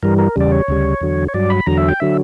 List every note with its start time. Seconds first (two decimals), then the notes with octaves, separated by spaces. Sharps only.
0.03 G2 E3 G3 A#4
0.18 A#4
0.36 E2 C#3 G3 D5
0.52 C#5
0.68 D2 C#3 G3
1.01 E2 D3 F#3
1.28 C#5
1.34 G2 F#3 D5
1.50 B5
1.66 E2 D3 F#3 A#5
1.78 E5
1.88 G5
2.00 D3 F#3 E5